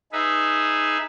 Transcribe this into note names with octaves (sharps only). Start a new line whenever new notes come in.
D#4 G#4 B4 E5